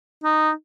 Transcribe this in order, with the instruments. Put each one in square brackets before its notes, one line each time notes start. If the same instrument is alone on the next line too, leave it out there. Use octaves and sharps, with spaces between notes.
[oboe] D#4